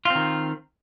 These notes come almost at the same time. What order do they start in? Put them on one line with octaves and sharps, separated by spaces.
F4 C4 D#3